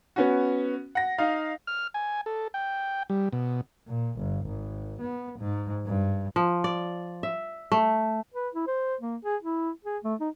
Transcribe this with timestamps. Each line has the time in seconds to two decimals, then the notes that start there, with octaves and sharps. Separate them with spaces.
0.16 B3 C#4 F#4
0.95 F#5 A#6
1.18 D#4 F5
1.67 F6
1.94 G#5
2.26 A4
2.54 G5
3.10 G3
3.32 B2
3.87 A#2
4.17 G1
4.46 G#1
5.01 B3
5.39 G#2
5.87 G2
6.36 F3
6.64 D5
7.23 E5
7.72 A3
8.34 B4
8.55 E4
8.67 C5
9.01 A#3
9.25 G#4
9.43 E4
9.85 G#4
10.04 A3
10.20 D#4